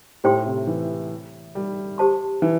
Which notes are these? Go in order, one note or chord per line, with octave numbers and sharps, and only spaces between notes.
A2 G4 C5 G5 C6
C3
E3
G3
G4 C5 A5 C6
E3